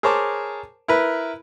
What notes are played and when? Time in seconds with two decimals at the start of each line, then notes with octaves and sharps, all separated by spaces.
0.03 G#4 A#4 C5 C#5 A5 D6
0.88 E4 A#4 B4